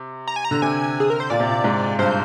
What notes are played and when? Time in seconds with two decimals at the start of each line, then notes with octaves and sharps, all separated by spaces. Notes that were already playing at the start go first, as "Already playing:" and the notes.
Already playing: C3
0.28 A#5
0.36 G#5
0.45 A#5
0.51 D3
0.62 C3 G#5
1.00 G#4
1.10 A#4
1.20 C5
1.30 A#2 D5
1.40 C3
1.49 A#2
1.64 G#2
1.99 G2 C5